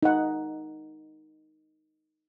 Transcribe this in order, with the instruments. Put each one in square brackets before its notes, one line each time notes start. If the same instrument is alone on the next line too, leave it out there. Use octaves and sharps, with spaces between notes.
[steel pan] D#4 F#5